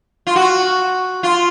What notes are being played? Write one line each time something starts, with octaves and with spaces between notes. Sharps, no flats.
F4
F#4
F4